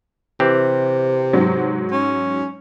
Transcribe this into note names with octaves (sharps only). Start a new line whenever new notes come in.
C3 E3 C4 G4
G#2 F#3
C#4